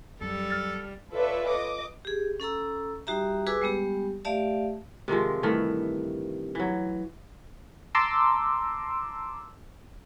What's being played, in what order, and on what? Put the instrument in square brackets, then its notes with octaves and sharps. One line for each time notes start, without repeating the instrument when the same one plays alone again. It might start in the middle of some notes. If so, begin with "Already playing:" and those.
[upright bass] F#2 [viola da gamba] G3 [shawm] A4
[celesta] F6 A6
[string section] F4 A4 B4 C#5 D5 E5
D#5 D6
[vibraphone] G4 G#4
C#4 A4 A#5 E6
G3 D#4 F#4 G4 E5 A#5
F#4 G#4 B4 G#5 D6 E6
G3 G#3 B3 G4
A3 G4 D5 E5 F5 A5
[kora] C3 D#3 F3 G#3
G2 D#3 E3 A3
E3 F#3
[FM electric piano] A5 A#5 C6 D6 E6